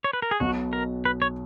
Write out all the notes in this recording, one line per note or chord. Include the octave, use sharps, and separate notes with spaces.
C#5
B4
A#4
G#4
B1 B2 F#3 F#4
A#4
B4
C#5